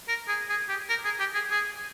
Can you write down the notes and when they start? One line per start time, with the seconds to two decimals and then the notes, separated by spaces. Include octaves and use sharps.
0.08 A#4
0.28 G#4
0.49 G#4
0.69 G4
0.89 A#4
1.05 G#4
1.20 G4
1.34 G#4
1.50 G#4